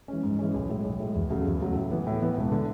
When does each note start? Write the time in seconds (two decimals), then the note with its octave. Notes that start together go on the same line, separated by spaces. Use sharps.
0.08 E3 G#3 C#4
0.23 G#2
0.39 E3 G#3 C#4
0.54 B1
0.69 A2 G#3
0.84 B1
1.00 A2 G#3
1.15 E2
1.30 C#3 F#3 A3
1.46 E2
1.60 C#3 F#3 A3
1.76 A2
1.91 E3 B3
2.07 A2
2.22 E3 B3
2.37 E1
2.52 D3